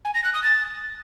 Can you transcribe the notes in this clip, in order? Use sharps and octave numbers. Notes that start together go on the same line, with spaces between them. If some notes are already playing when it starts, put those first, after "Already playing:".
G#5
A#6
F#6
D#6
A6